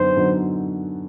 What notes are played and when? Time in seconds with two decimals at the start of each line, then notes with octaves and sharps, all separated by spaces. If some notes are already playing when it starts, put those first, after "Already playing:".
Already playing: F#2 D3 F#3 B3 D#4 C5
0.16 F#2 D3 F#3 B3 D#4